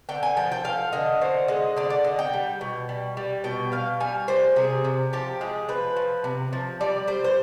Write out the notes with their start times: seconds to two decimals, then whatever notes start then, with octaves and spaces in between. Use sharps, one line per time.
0.09 D3 G5
0.23 G#5
0.37 F3 G5
0.52 G5
0.64 D3 F5
0.93 D3 D#5
1.21 D3 C5
1.48 G#3 D#5
1.76 D3 D5
1.90 D5
2.04 D3 D#5
2.19 G5
2.33 G3
2.61 B2
2.89 G3
3.17 G3
3.44 B2 G5
3.72 B2 F5
4.00 G3 G#5
4.28 G3 C5
4.56 C3 G#4
4.85 C3
5.13 F3 G4
5.41 G#3 G#4
5.69 F3 B4
5.96 F3
6.24 C3
6.53 F3
6.81 G3 D5
7.07 G3 C5
7.24 C5